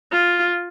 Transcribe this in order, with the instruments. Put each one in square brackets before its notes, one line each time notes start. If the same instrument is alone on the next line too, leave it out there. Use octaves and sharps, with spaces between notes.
[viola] F4